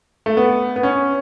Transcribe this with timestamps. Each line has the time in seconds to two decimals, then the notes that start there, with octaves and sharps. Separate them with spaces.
0.26 A3
0.37 B3
0.76 B3
0.83 C#4